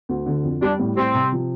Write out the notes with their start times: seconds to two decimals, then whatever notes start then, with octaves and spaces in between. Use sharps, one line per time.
0.09 D2
0.26 D3
0.44 F2
0.62 G3 D4
0.79 A2
0.96 G3 C4
1.14 C3
1.32 F3